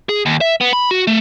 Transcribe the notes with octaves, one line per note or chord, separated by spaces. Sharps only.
G#4
D#2
E5
B3
B5
F#4
A3